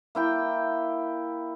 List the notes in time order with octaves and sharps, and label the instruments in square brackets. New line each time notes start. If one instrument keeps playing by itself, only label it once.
[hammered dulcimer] A#3 E4 G5